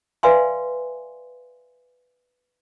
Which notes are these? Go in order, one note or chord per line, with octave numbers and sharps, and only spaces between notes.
B4 D5 E5 F5 G#5 C6